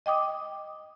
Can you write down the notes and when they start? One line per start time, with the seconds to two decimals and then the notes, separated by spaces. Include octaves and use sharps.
0.06 D#5 G5 D6 D#6